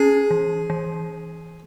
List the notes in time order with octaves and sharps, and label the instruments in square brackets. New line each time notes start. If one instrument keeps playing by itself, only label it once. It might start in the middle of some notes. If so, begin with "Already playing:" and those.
Already playing: [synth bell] C#4 [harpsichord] G#4
[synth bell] E3
E3